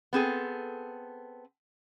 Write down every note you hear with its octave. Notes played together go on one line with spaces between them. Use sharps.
B3 C4 G#4 A4